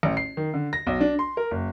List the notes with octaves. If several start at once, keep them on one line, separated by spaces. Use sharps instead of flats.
A1
C7
D#3
D3
A#6
B1
D4
C6
A#4
F#1